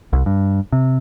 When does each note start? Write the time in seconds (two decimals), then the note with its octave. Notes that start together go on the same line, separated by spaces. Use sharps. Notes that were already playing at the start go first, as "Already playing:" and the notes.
0.13 C2
0.26 G2
0.72 C3